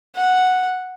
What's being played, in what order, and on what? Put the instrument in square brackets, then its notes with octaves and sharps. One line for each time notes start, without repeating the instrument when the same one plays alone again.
[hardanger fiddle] F#5